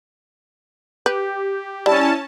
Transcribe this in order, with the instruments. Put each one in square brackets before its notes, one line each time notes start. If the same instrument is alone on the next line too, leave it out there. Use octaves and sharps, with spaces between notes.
[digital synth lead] G4 [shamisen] B4
[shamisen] G3 [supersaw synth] C#4 A5 [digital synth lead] E4